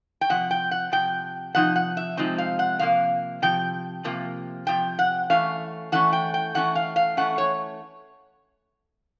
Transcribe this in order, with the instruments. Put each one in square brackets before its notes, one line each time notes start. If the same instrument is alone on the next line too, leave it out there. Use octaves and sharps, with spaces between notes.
[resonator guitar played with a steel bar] G5
C3 F3 F#5
G5
F#5
C3 F3 G5
C3 F3 D#4 F#5
F#5
E5
C3 F3 G#3 C4 D#4
F5
F#5
C3 F3 A#3 F5
C3 F3 G5
C3 F3 A#3
C3 F3 G5
F#5
E3 A3 C#4 F5
E3 A3 C#4 F#5
G5
G5
E3 A3 C#4 F#5
F5
F5
E3 A3 C#4 F#5
C#5